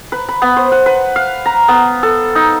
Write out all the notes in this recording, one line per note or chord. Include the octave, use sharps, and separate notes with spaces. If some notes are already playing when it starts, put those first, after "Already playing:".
B4
B5
B3
C5
F#5
B4
F5
A#5
B3
A4
D#4